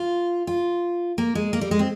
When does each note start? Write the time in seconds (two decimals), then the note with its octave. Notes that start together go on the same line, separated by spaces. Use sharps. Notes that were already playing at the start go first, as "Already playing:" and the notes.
Already playing: F4
0.47 F4
1.18 A#3
1.35 G#3
1.53 A#3
1.61 G3
1.71 G#3
1.79 C4